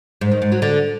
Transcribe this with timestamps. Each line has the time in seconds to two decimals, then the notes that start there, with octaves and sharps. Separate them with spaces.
0.21 G#2
0.31 D#3
0.42 G#2
0.52 F#3
0.62 D3